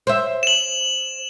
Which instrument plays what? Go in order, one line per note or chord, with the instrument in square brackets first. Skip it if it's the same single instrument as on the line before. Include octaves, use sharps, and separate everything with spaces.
[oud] C5 E5
[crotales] E7 F#7